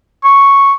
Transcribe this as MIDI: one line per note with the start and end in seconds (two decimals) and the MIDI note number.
0.24 0.73 85